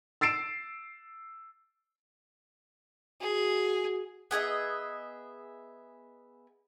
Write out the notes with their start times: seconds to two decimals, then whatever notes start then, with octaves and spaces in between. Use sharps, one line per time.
0.21 E6 A6 C7 D7 E7
3.21 F#4 G#4
4.31 B3 G#4 D#5 E5